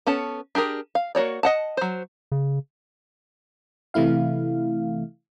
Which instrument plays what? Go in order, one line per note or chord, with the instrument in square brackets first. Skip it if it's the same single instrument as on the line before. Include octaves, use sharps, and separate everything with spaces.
[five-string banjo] B3 C#4 A4 A5
D4 G4 G#4 A#4
F5
A#3 F#4 C#5 D5
D#5 F#5 A5
F#3 C5
[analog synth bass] C#3
[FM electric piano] C3 E3 A3 E4 F5